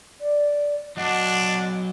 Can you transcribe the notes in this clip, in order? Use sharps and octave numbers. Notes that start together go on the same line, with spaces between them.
D5
F#3 D4 D#5 F#5